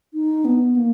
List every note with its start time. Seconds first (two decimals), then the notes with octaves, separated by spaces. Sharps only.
0.14 D#4
0.45 B3
0.76 A#3